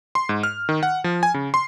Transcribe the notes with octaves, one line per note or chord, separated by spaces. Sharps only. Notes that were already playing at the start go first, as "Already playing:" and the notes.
C6
G#2
F6
D#3
F#5
F3
G#5
C#3
C6